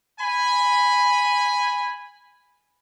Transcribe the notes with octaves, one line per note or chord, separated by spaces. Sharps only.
G#5 B5